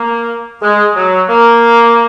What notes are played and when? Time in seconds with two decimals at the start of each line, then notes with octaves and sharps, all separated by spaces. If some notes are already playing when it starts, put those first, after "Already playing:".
Already playing: A#3
0.62 G#3
0.95 F#3
1.29 A#3